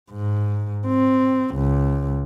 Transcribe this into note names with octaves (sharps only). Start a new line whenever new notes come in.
G#2
C4
C#2